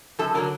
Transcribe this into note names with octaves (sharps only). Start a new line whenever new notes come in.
F#2 A4
D3 F#3 A#4